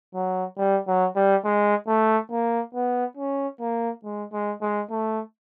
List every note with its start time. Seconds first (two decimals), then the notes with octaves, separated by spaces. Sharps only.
0.15 F#3
0.58 G3
0.88 F#3
1.16 G3
1.45 G#3
1.88 A3
2.31 A#3
2.75 B3
3.17 C#4
3.60 A#3
4.04 G#3
4.33 G#3
4.62 G#3
4.91 A3